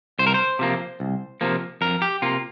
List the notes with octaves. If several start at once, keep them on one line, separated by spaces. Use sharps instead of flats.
C2 C5
A#4
C5
C3 F3 A#3
C2
C3 F3 A#3
F2 A#4
G4
C3 A#3 F4